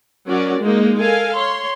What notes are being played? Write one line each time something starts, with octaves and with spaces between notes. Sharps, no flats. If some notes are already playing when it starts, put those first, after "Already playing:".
F#3 C#4 F#4 A#4 D5
G#3 A#3 D#4
A4 A#4 F5 G#5
C#5 C6